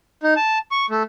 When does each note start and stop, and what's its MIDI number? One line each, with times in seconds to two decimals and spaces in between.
0.23 0.34 63
0.36 0.59 81
0.71 0.86 85
0.90 1.03 57